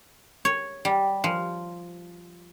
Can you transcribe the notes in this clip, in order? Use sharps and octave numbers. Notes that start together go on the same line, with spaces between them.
C#5
G3
F3